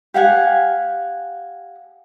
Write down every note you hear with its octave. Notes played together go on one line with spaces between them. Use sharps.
G4 F5 F#5 G#5